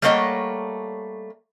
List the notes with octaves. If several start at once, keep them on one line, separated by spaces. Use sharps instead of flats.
G3 A3 A#3 C#5 D#5 F#5